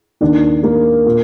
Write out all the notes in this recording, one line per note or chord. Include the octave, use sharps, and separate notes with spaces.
D#2 D#3 D4
A#3
A#2